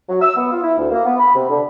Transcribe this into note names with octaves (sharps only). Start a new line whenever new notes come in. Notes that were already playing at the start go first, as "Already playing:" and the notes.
F#3
E6
B3
F4
E4
D2
A#3
B3
B5
C3
D3